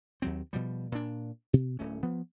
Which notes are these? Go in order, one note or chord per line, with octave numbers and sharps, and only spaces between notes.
D#2 F#3 C4
B2 F3 G3
A#2 D4
B2
D1 A3 C#4
F3 B3